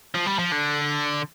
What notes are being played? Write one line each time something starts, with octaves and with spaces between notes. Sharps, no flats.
F3
G3
F3
D3